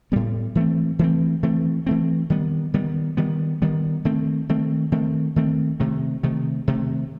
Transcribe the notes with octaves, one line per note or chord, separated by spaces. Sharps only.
A2 G3 B3
E3 A3 C4
E3 A3 C4
E3 A3 C4
E3 A3 C4
D#3 G3 B3
D#3 G3 B3
D#3 G3 B3
D#3 G3 B3
D#3 A3 C4
D#3 A3 C4
D#3 A3 C4
D#3 A3 C4
C3 D#3 A3
C3 D#3 A3
C3 D#3 A3